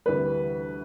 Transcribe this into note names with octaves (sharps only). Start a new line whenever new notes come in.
D2 C3 E3 G3 B4